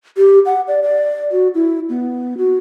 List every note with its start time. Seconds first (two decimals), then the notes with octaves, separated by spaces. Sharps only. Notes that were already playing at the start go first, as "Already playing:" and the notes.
0.17 G4
0.46 F#5
0.68 D5
0.83 D5
1.32 F#4
1.55 E4
1.89 B3
2.38 F#4